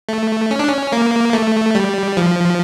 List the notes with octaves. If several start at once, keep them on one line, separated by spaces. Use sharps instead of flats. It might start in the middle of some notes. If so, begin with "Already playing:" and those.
A3
C#4
D4
C#4
A#3
A3
G3
F3